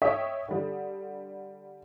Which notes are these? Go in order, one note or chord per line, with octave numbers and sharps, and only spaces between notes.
C#5 D#5 E5 G5 D#6 B6
D3 G3